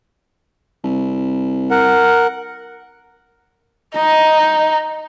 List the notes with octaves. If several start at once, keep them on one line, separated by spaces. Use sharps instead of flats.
C2
A#4 F#5
D#4 D#5